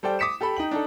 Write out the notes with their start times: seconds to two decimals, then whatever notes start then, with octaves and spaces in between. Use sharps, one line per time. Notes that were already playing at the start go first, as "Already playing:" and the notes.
0.03 G3 A4 C5 D5 G5
0.19 D6 D#6 B6 C#7 E7
0.41 G4 A4 G5 B5
0.57 D#4 G5 F#7
0.71 D4 D#4 A4